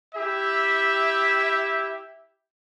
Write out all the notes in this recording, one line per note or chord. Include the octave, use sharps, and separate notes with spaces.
E4 G4 E5